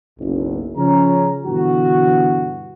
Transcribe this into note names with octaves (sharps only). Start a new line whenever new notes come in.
F#1 B1
C#3 F3 C#4 A#5
G2 B2 D3 E3 F#4